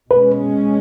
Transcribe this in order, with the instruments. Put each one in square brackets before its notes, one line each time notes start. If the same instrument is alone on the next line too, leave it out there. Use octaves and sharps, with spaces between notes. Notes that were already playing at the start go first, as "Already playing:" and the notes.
[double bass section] B2 G#3 C#4 [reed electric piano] B4